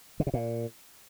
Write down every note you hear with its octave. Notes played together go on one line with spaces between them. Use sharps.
D3
C3
A#2